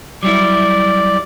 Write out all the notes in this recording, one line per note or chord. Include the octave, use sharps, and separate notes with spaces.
F#3 G3 E4 D5